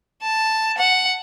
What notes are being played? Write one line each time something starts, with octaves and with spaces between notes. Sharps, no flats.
A5
F#5